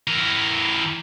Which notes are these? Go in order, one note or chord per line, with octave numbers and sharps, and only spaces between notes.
E3 A#4